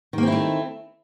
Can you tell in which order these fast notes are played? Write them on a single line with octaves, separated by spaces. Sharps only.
D#3 A#3 C4 E4 A3